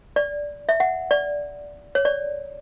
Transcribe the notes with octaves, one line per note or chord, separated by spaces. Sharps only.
D5
E5
F#5
D5
C#5
D5